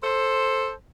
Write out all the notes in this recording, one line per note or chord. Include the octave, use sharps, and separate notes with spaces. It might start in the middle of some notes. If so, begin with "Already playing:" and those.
A4 C5